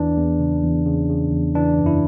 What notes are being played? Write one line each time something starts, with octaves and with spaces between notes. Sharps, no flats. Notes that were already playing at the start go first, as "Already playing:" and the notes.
Already playing: E2 E3 D4
E2
C#3
E2
C#3
C#3
E2
E3 D4
F#2
E4